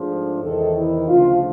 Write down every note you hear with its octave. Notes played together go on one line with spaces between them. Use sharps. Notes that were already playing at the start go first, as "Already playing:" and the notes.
Already playing: G#2 F3 A3 D4 G#4
E2 C3 D#3 A4
E4
D2 C#3 F3 A3 F4